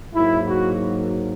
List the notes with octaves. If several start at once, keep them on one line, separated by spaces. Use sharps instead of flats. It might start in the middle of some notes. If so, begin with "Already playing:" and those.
G#2 F#3 A#3 E4
F#4